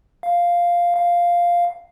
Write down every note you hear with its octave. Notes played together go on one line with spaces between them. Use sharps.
F5
F5